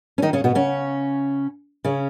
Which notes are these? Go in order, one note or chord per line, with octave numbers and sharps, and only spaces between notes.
C#4
D#3 D#4
C#3 C#4
B2 B3
C#3 C#4
C#3 C#4